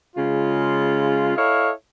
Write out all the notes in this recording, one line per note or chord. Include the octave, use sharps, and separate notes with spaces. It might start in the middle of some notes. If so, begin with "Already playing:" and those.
C#3 G#3 F4
E4 A4 C#5 D#5 F5